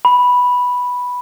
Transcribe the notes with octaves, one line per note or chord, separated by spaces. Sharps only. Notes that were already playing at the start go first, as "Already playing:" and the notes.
B5